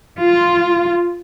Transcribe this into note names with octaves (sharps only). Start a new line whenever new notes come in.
F4